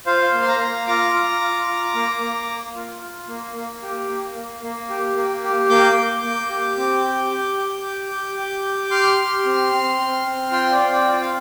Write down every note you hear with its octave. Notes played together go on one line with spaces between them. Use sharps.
F4 C5 F5
A#3
C6
F5 A#5
A#3
F4 A#5 D6
F4
F4
F4
A#3
A#3
A#3
F4
F4
A#3
A#3
G4
A#3
A#3
A#3
G4
A#3
G4
A#3 D6 G6
A#3
A#3
G4
C4
G4
G4
G4
G4
G4
G4
G4
G4 C6 F6
G4
C4
C4
C4
C4
F4 G5 C6
D5 G5
C4
D5 G5
F4
G5
F5